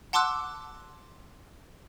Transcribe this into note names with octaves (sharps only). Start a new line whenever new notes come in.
F#5 A5 C6 D6 E6 F#6